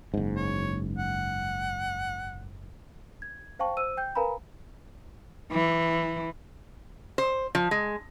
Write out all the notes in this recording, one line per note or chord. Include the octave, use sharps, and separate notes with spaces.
F#1 G#2
C#5
F#5
G#6
C5 F5 G5 A5 C#6
C5 E6 D#7
G5 G6
A#4 B4 F5 G#5 A#5 B5
E3
C5
F3
G#3